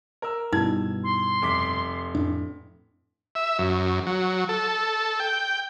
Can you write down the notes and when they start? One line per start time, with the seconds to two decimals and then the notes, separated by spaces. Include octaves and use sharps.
0.22 A#4 E6
0.53 G2 B2 D#4 E4 G#6
1.04 C6
1.42 F1 D6 B6
2.15 F2 A2 D4
3.35 E5
3.58 F#2
4.07 F#3
4.49 A4
5.20 G5